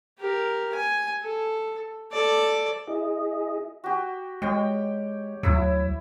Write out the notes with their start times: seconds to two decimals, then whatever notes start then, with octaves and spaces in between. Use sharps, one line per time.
0.19 G4 A#4
0.75 G#5
1.23 A4
2.12 A4 D5
2.87 E4 G#4 D#5
3.84 F#4 G4
4.42 G#3 C#5 G5
5.43 D2 F#3 E4 E5 E6